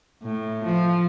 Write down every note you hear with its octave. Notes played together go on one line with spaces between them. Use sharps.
A2
F3